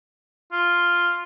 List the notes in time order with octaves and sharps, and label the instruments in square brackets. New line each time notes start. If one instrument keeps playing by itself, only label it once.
[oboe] F4